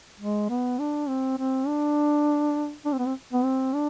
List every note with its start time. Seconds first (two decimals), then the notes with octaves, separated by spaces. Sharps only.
0.20 G#3
0.49 B3
0.79 D4
1.08 C4
1.38 C4
1.67 D4
2.85 D4
2.93 C4
2.99 B3
3.06 C4
3.33 B3
3.44 C4
3.73 D4